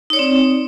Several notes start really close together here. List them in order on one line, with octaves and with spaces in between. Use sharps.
D#4 C#5 D5 C4